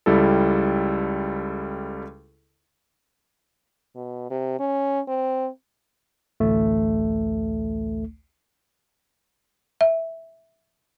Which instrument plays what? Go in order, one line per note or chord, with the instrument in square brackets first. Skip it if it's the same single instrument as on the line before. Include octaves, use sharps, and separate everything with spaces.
[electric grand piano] C#2 G3 E4 A4
[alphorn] B2
C3
C#4
C4
[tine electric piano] A1 D2 A3
[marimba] E5